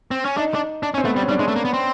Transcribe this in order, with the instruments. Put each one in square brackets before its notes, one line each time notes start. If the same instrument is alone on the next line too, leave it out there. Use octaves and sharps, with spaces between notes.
[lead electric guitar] C4
C#4
[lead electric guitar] D4 [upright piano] D#4
[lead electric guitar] D4
D4
C#4
[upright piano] C4
[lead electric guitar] A3 [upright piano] B3
[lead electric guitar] G3 [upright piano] C4
[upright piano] C#4
[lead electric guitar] G3 [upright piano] D4
[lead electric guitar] G#3 [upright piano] D4
[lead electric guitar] A3
A#3
B3
C4